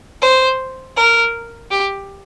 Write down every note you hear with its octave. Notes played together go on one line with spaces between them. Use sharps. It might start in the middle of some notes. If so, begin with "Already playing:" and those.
C5
A#4
G4